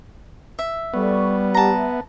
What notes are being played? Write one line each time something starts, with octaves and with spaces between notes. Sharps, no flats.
E5
G3 B3 A4 D5 C#6
G4 F#5 A5 A#5
E5